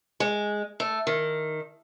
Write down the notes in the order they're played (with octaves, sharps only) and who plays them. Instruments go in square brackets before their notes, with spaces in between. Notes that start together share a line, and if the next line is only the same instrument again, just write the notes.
[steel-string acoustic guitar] G#3
A3
D#3